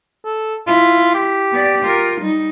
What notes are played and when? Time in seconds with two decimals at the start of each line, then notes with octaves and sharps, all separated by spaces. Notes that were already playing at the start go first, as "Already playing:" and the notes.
0.25 A4
0.67 E4 F4
1.15 G4
1.52 B3 D5
1.82 F4 A#4
2.21 G3 D#4